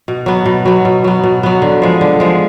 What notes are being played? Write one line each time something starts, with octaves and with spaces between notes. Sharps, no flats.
B2
F#3 B3
B2
F#3 B3
B2
F#3 B3
B2
F#3 B3
D3
F3 G#3
D3
F3 G#3